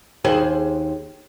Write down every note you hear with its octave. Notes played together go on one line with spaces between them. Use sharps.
D#2 G#4 C5